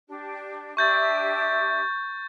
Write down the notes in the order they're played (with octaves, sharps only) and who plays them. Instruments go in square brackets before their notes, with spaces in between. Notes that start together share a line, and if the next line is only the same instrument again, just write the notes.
[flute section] D4 G4
[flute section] D4 G4 E5 [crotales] C#6 G6 A6